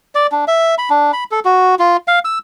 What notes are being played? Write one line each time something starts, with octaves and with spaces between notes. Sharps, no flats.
D5
D4
E5
B5
D4
B5
A4
F#4
F4
F5
E6